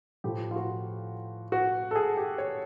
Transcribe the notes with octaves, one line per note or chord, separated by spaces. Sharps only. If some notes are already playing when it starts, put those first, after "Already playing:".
A2 F3 G4
F4
F#4
F#4
A4
G#4
G4
C#5